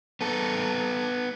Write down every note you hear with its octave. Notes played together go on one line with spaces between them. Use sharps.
B3 A4